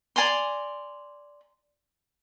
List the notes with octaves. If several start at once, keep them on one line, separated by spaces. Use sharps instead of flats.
D5 G#5 A#5 C6